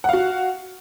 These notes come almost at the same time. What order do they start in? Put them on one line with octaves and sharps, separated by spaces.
F#5 F5 F#4